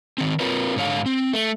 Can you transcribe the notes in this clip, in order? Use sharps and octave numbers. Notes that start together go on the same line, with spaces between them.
D#3 C4
C4 F4 A#4 B4 C#5
G#2 D3 C#5 F5
C4
A3